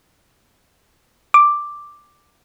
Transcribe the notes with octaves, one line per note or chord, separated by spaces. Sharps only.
D6